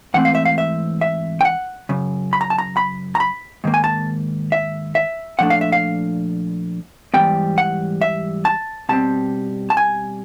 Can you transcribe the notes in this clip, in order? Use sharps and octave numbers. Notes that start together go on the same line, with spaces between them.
G#2 E3 A3 C4 F#5
F5
E5
F5
E5
E5
G5
F#5
F#2 C#3
B5
A#5
A5
A#5
B5
A#5
B5
G#2 D#3 A#3
G#5
A5
E5
E5
A#2 F3 A3 D4 F#5
F5
E5
F5
G#2 E3 G3 B3 G5
F#5
E5
A5
B2 G3 C4 A5
A5
G#5